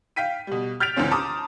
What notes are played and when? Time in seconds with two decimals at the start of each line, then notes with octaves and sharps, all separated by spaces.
0.16 F5 G5 B6 D#7
0.47 B2 G3
0.80 F6 G6 A6 B6 D7 F7
0.96 C#2 D3 E3 C4 C#4
1.11 A5 A#5 C6 D6 D#6